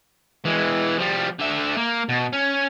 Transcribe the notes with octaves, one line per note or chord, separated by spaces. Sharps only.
E3 G#3
F3 G3
D3 E5
A#3
B2
C#4